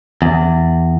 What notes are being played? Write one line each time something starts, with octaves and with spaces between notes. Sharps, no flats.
E2